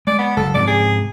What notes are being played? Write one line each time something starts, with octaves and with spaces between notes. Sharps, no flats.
G#3 D5
B3
F#1 A4
G#2 C3 F3 D5
G#4